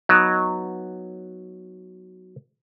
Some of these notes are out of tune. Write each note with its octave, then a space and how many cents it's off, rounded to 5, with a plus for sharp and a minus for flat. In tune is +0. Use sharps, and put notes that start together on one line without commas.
F#3 -5 B3 +0 D#4 +5